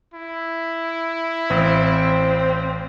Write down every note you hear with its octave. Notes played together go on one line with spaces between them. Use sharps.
E4
A1 C4